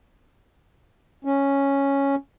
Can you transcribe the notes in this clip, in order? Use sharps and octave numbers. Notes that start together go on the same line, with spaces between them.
C#4